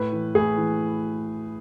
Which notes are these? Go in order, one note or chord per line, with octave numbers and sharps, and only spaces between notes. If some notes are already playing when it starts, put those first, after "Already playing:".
Already playing: A2 B4
E3
A2 G#4
E3